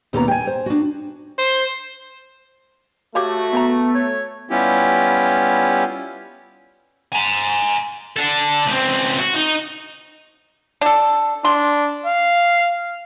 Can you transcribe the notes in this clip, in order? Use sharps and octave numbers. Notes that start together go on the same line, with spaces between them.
D#2 B2 A#3 B3 C#4 A#5
G5 G#5
C5
D4 F#4
C5
A3 F#4 G4 C#5 F5
B3 E5 G5 A#5
C#5
G3 B3 C#4 E4 F4 G4
G#5 A#5
D4 A4
C#2 C4
F#4
D#4
D4 A4
D4 C6
F5